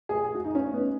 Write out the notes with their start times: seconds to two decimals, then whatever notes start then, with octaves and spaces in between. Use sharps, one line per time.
0.09 G#4
0.25 G#4
0.35 F#4
0.44 D#4
0.55 C#4
0.73 B3